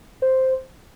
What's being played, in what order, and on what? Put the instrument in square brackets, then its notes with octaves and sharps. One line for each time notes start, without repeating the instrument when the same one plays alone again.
[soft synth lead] C5